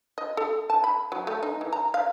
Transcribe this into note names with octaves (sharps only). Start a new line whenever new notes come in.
D#5
A4
A5
B5
F#3
A3
D#4
E3
A#5
F5